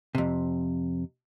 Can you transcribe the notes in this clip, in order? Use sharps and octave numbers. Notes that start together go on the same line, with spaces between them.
F2 C3